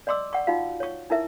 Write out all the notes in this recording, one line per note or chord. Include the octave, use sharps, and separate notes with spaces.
D5 D#5 C6 D6 E6
D5 F#5 C#6
D#4 F4 F#4 F5
C#5 C#6
D#4 E4 A#4 E5